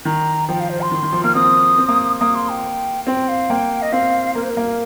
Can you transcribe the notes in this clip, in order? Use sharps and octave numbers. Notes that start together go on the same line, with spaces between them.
D#3 A#5
F3 G5
F5
C5
C6
D#3
D#3
F3
A#3 F6
C4 D#6
C4
A#3
A#3 D#6
C6
G5
C4 G5
F5
A#3 G5
D#5
C4 F5
A#3 A#4
C5
A#4
A#3